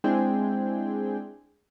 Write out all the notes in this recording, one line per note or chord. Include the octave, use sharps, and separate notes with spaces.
G#3 C4 D4 E4 G#4 G5